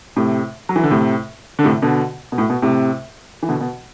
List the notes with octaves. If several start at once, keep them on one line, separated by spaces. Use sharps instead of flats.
A2 C3
F#3
E3
D3
A2 C3
D3
A2 C3
B2 D3
B2
A2
B2
A2 C3
E3
B2 D3
B2